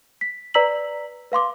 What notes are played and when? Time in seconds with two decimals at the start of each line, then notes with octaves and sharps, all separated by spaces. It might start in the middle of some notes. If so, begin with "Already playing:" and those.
0.21 B6
0.54 B4 D5 A#5 E6 B6 F#7
1.32 B4 F5 C6 D6